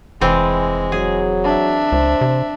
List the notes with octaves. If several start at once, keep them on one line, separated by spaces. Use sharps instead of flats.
F1 E3 G#3 C4
F#3 G#4
D4 E5
C#2 C5
C3